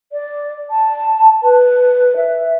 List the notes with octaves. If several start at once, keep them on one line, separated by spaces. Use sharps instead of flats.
D5
A5
B4
E5